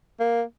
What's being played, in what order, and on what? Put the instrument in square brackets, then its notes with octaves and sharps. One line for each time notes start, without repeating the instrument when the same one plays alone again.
[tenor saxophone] A#3